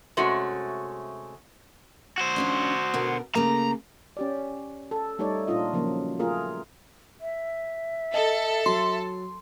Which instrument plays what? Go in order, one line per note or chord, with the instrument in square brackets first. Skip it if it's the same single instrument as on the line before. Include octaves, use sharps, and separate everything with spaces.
[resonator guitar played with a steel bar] C3 G#3 A3 C#4 F#4
[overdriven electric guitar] F#4 C5
[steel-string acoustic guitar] F3 C#4 D4
B2 D3 A#4
[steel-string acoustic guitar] C#3 A3 A#3 [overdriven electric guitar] A#5
[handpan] C#4 G4 D5
A4
G3 A3 D#4 A4 C#5 D5
A#2 D4 D#4 F4 D#5
C#3 F3 F#3 A#3
A3 F4 G#4 A#4
[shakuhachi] E5
[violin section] A4 [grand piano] D#5
[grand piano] F#3 [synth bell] C6